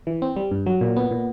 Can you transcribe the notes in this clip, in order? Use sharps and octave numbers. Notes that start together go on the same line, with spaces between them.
E3
C4
G3
G2
F#3
A#2
B3
A#2